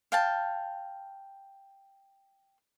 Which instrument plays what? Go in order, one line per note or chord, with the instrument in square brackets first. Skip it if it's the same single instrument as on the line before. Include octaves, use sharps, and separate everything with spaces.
[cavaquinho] F5 G5 A5